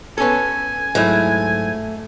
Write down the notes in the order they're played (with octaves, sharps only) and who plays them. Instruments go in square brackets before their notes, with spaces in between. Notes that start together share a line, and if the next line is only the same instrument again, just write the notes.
[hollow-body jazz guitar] B3 C#4 A4 [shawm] G#5
[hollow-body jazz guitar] G#2 F#3 E4 [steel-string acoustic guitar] A3